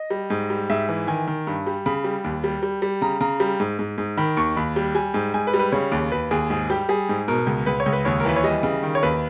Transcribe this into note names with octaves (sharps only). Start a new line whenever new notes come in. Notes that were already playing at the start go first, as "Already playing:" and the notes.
Already playing: D#5
G3
G#2
G3
G#2 E5
E3
D#3 G#5
D#3
G2
G3
C#3 B5
G3
D#2
G3
G3
G3
C#3 A#5
C#3 A#5
G3
G#2
G#2
G#2
D#3 B5
D#2 C#6
D#2 B5
G3
G3 G#5
G#2
G#2 G#5
B4
G3
B4
C#3 C#5
D#2
D#2 B4
D#2 G#4
G#2 G#4
G3 G4
G3 G#4
G#2
B2 A#4
C#2
C#2 B4
C#5
C#2
B4
D#2 C#5
A#4
E3 B4
C#5
G3 D#5
C#3
D#3
C#5
D#2 B4